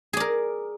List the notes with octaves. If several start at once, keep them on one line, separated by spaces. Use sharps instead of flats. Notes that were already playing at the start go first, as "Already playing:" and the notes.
G#4 A#4 D5